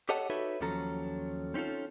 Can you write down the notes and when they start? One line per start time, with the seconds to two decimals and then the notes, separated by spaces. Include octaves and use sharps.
0.09 G4 A4 C#5 D#5 F#5 A5
0.30 D#4 F#4 A4 B4 C#5 E5
0.61 D#2 F3 F#3 C#4 A4 A#5
1.54 C4 C#4 D#4 F4 A4